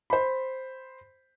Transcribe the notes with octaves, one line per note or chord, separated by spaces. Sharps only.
C5 B5